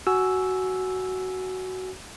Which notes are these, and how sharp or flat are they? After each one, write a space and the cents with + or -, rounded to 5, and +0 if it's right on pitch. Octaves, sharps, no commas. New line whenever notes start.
F#4 +10 G#5 +15 E6 +0